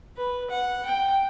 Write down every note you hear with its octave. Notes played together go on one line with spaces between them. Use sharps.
B4
F#5
G5